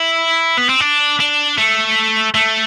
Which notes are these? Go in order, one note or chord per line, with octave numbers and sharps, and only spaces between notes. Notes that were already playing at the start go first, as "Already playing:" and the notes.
Already playing: E4
B3
C4
D4
D4
A3
A3